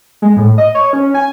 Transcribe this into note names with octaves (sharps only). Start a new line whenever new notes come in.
G#3
A2
D#5
C#5
C#4
G#5